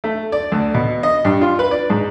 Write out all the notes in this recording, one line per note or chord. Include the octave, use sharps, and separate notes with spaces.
A3
D5
D2
B2
D#5
G2
F4
B4
D5
G#2